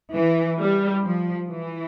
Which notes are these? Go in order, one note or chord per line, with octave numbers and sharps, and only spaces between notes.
E3
G3
F3
E3